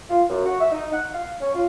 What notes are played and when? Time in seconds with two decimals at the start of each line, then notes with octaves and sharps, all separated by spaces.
0.10 F4
0.28 F#2
0.45 F#4
0.60 E5
0.72 D#4
0.92 F#5
1.13 F5
1.40 C#4
1.55 F4